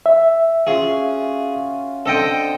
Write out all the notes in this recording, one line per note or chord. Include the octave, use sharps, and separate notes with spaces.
E5
C#4 F4 F#4 G#4
D3 C4 A4 D#5 G5